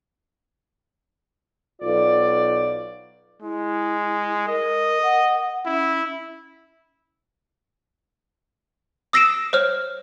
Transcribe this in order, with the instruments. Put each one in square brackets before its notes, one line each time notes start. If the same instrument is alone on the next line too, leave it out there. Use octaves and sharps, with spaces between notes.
[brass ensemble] B1 F4 D5
[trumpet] G#3 [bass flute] E4
[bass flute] A#4 [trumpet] D#5
[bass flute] F#5
[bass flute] C#4 [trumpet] E4
[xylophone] D#6 E6 A#6 C7 D7 E7
C5 C#5 F6